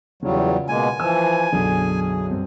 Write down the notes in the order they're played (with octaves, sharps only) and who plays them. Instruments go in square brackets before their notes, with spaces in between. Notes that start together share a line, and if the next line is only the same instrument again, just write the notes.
[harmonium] E2 F#3 G3 [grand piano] C#3 F4
[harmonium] B2 G#3 A#3 [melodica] G#5
[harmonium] E3 F3 [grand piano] E6
[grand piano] B1 F#2 D3 [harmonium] G#4
[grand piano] G2 C4